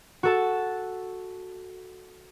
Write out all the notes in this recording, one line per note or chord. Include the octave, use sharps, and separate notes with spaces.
F#4 A4 A5